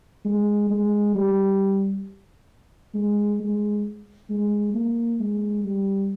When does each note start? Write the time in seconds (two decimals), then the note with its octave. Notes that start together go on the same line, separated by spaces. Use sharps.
0.25 G#3
0.70 G#3
1.15 G3
2.94 G#3
3.40 G#3
4.30 G#3
4.74 A#3
5.20 G#3
5.64 G3